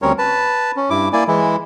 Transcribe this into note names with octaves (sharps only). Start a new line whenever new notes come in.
D2 G3 C4 C#4 A#4 C#5
B4 A5
C#4
G2 E4 D6
A#3 E4 D5 G#5
E3 G#3 E4